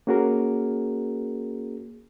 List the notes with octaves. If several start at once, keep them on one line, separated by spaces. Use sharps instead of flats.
A#3 C#4 F#4 G#4 A#4